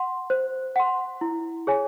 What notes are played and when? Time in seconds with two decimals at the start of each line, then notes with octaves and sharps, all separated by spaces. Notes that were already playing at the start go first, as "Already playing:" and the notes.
Already playing: F#5 C6
0.30 C5
0.76 F#5 C6
1.21 E4
1.67 G#4 C#5 G#5